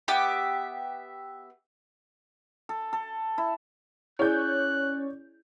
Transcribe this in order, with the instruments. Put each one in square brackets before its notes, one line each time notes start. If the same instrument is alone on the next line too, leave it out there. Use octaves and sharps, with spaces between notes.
[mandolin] B3 G4 E5
[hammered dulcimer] A4
A4
E4
[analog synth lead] C#4 [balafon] E4 G#4 [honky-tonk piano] C#5 D5 G6 [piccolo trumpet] F#6